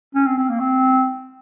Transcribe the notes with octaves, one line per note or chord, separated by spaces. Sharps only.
C#4
C4
C4
A#3
C4